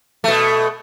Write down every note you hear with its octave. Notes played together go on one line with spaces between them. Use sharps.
B2 A3